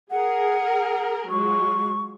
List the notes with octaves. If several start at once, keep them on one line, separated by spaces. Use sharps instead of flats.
G#4 A#4 F#5
F#3 G#3 F4 C#6